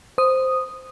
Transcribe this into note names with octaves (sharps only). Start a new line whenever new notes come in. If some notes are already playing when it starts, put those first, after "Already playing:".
C5 D#6